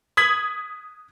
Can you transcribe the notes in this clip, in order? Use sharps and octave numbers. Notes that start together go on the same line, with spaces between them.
D#6 G#6 B6 F#7